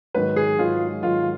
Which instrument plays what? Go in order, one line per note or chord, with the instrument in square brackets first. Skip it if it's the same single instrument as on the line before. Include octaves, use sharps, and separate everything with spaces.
[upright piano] G#2 D#3 F#3 [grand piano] B4
[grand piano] G#4
[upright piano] G#2 D#3 F#3 [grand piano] F4
[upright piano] G#2 D#3 F#3 [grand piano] F4